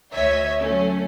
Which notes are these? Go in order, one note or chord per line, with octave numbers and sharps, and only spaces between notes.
D2 C#5 D#5 E5 G#6 B6
F#3 A3 C#4